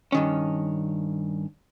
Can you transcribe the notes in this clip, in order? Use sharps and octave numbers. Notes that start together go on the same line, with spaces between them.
G2 D#3 C#4